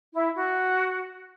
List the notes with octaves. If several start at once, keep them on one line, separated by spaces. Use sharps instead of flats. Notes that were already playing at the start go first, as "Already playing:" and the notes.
E4
F#4